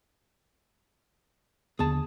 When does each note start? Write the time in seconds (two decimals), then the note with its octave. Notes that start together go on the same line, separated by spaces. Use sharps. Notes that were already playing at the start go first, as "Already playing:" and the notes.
1.79 D#2 D3 B3 G#4 A5